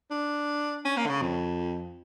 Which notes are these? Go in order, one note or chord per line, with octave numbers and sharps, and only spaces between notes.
D4
C#4
A#3
D3
C#3
F2